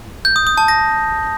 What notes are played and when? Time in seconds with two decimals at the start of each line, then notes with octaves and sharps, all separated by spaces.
0.25 G6
0.36 D#6
0.47 D#6
0.58 A5
0.68 A#6